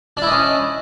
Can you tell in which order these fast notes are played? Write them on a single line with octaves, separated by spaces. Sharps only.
D4 E4 D#5 C#4